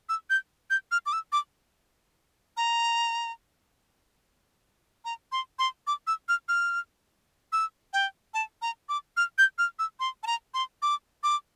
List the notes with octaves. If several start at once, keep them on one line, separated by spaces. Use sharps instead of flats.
E6
G6
G6
F6
D6
E6
D6
A#5
A#5
C6
C6
D6
E6
F6
F6
E6
G5
A5
A#5
D6
F6
G6
F6
E6
C6
A5
A#5
C6
D6
D6